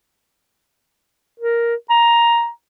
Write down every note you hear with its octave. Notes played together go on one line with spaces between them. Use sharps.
A#4
A#5